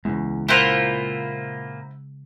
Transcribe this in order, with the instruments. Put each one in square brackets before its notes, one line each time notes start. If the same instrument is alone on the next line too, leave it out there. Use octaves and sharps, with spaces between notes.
[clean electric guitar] E2 [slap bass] C#3 G#3
[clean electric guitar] A#2 A#3 F4 [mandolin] E4 C5 F#5